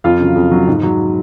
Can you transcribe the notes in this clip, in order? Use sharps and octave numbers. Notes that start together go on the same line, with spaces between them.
F2 F4 F5
C#3 F#3
F2
C#3 F#3
G#2
F#3